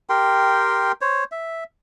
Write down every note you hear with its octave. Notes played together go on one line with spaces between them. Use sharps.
G4 A#4 G5 C6
C5 C#5
E5